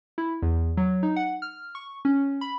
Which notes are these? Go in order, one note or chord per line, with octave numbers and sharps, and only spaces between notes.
E4
E2
F#3
D#4
F#5
F6
C#6
C#4
B5